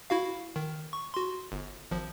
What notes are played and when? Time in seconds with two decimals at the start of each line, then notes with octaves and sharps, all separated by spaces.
0.10 E4 F#4 F5
0.56 D#3
0.93 C#6
1.14 F#4 C6
1.52 G1
1.91 G#1 F3